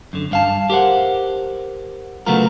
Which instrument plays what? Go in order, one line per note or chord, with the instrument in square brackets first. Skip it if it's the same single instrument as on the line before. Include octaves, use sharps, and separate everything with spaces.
[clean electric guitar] F#2 D3
G2 F5 A5
G4 A#4 C5 F#5
C#3 F#3 A3 B3 F4 A#4